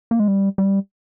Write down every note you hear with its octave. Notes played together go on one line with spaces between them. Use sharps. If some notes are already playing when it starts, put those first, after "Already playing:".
A#3
G#3
G3
G3